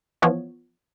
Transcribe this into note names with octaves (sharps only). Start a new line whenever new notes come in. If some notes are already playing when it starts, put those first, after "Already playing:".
E3 F3 B3 C#5